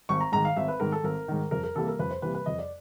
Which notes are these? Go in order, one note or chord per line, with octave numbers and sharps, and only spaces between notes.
G#1 C#6
A#5
G#2 D#3 A#5
F5
G#1 E5
B4
G#2 D#3 A#4
A4
G#1 A#4
G#2 D#3
F2 A#4
A#4
C3 E3 G3 A#3 A4
A#4
F2 B4
C5
C3 E3 G3 A#3 B4
B4
F2 D#5
D5